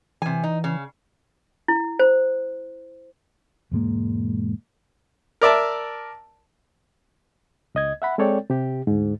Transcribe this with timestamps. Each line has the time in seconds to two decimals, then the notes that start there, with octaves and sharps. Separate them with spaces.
0.22 C3 E3 G#5
0.43 D#4
0.64 C#3
1.68 E4
1.99 C5
3.72 E1 G#2 G#3 A#3
5.41 A#4 D5 E5 A5
7.75 C#2 D#5 G#6
8.02 E5 F#5 B5
8.18 G#3 C4 A4 C#5 D5 G5
8.50 C3 G4
8.87 D2 G#2